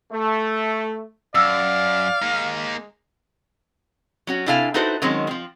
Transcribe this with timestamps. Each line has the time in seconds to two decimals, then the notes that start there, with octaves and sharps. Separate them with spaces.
0.13 A3
1.35 F#2 D5 F5 E6
2.22 G#3 A#3 D#4
4.27 F#3 C#4 F#4
4.46 C3 D4 E4 A4 F5 G#5
4.74 D#4 E4 F#4 A4 B4 C5
5.02 D#3 F#3 G#3 C4 C#4
5.27 F3 C4